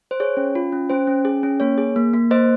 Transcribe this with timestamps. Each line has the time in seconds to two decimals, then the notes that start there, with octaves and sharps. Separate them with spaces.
0.11 C5
0.20 G#4 C#5
0.37 C#4
0.55 F4
0.72 C#4
0.90 C#4 C5
1.07 C#4
1.25 G#4
1.43 C#4
1.60 A#3 C#5
1.78 G#4
1.96 A#3
2.14 A#3
2.31 A#3 C5 D#5